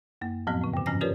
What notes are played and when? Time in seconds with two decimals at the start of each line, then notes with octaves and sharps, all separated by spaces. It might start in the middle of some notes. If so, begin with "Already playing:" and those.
0.21 F#2 A#3
0.47 F2 A2 F3 F#3 B3 C4
0.61 A2 C#3
0.74 G2 D3
0.86 G#2 F3 C#4 G#5 A#6
1.01 F4 G4 A#4 B4 C#5 D5